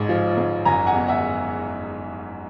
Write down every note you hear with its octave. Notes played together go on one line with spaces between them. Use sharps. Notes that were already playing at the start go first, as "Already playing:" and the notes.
Already playing: A1 G#2
F3
G#2
F#1 G#5 A#5
F#5 G#5
E2
E5 F#5